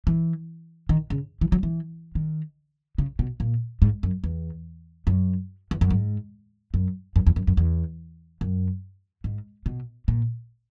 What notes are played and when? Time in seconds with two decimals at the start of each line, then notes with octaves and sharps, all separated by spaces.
0.07 E3
0.89 D#3
1.10 C#3
1.41 E3
1.52 F#3
1.63 E3
2.15 D#3
2.98 C#3
3.19 B2
3.40 A#2
3.82 G#2
4.03 F#2
4.24 E2
5.07 F#2
5.71 E2
5.81 F#2
5.91 G#2
6.74 F#2
7.16 F#2
7.27 E2
7.36 F#2
7.47 F#2
7.57 E2
8.41 F#2
9.24 G#2
9.66 B2
10.08 A#2